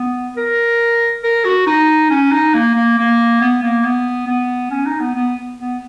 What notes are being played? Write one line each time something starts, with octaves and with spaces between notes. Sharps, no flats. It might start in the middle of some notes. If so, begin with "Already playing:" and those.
Already playing: B3
A#4
A#4
F#4
D#4
C#4
D#4
A#3
A#3
A#3
B3
A#3
B3
B3
C#4
D#4
B3
B3
B3